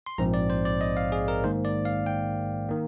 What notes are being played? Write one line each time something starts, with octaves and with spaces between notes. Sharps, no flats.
C6
A#1 G#2 F3 C4 A#5
D5
C5
D5
D#5
F5
G#4
A#4
G#2 D#3 A#3 C5
D5
F5
G5
D#3 A#3